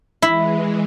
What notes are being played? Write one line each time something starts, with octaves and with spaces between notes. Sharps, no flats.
E3 G#3 E4